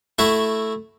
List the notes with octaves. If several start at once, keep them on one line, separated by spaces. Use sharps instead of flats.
A3 E4 F#4 E5 F#5